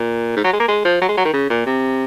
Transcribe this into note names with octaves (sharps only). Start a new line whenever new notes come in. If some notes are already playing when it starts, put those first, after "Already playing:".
Already playing: A#2
G#2
F#3
G#3
A#3
G#3
F3
F#3
G#3
F#3
D#3
C#3
A#2
C3